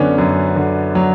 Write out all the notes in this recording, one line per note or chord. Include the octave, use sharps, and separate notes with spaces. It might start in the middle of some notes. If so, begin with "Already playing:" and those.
Already playing: F#2 D3 B3 C#4 D4
F#2
D3
F#3